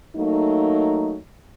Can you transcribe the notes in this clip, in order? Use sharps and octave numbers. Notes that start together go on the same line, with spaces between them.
F#3 A3 A#3 D#4